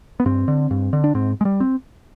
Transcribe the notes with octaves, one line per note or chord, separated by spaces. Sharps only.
B3
G2 C4
D3
G2
D3
D4
G#2 C4
G#3
G3
C4